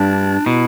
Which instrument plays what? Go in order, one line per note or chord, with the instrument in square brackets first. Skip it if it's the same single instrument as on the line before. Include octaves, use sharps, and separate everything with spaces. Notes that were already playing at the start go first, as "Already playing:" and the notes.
Already playing: [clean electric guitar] G2 [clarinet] D4
[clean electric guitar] B2 [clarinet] E4